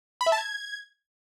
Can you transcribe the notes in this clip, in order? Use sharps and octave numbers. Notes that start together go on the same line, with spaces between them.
B5
E5
A5
G#6